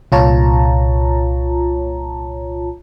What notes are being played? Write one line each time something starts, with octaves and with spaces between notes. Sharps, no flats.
C2 A#2 F4 C#5 A5 A#5